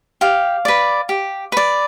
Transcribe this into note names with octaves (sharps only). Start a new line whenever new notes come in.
G4 F5
B4 D5
G4
B4 D5